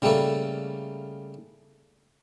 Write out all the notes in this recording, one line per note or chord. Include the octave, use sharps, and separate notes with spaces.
C#3 G3 A3 A#3 A4